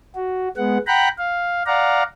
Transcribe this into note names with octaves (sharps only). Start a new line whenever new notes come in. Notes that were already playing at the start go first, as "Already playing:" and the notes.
F#4
G#3 B3 F#5
F#5 G5 A#5 B5 F#6
F5
D5 F5 F#5 A#5